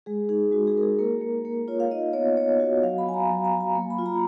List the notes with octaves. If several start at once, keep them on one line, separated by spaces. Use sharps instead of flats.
G#3 G#4
D#4 G#4
G#3 F#4
G#4
G#3 A#4
G#4
A#3 A#4
A#3
A#3
F4 C#5
F5
D#4 D#5
B3 C#5
B3 C#5
F#4
F#3 F5
B5
F#3 G#5
A#5
F#3
A#5
F#3
A#5
A#3
B5
F4
A#5